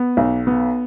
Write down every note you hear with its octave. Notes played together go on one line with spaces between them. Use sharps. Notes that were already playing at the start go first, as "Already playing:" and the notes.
Already playing: B3
B1
B3